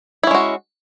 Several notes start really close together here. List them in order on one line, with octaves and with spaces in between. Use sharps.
E4 C#4 G#3 F#4